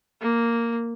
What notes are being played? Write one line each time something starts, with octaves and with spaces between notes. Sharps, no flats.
A#3